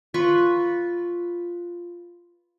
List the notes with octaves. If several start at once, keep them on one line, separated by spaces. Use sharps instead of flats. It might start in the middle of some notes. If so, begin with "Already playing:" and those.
F4 B4 B5 C#6